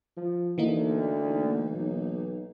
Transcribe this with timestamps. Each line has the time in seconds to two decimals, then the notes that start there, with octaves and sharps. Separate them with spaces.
0.17 F3
0.58 D2 E3 A#3 D#4
1.71 B1